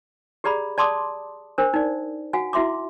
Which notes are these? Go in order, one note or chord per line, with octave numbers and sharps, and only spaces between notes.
G4 G#4 D5 A#5 B5
D5 A5 C6 D6 D#6
D4 A#4 C5
D#4 D5
F#4 F5 F#5 G#5
E4 F#4 E5 C6 D6